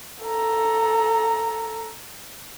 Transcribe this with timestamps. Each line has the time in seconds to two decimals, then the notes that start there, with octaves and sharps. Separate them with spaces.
0.23 A4 A#5